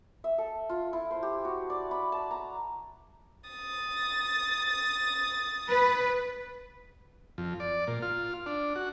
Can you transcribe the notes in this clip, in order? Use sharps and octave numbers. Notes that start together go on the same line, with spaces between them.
E5
A4
F4
E4
C5
G4
F#4
D5
B5
A5
A#5
D#6 A6
B4
F2
D5
A#2
F4
D4
F#4